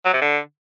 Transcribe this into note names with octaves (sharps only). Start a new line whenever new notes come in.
F#3
C3
D3